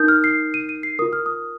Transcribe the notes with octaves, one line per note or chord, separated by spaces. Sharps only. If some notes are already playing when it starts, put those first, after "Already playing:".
Already playing: D#4 A#4 D#6 G6
F6
C7
D#7
D#7
C7
F4 A#4 D#6
F6
D#6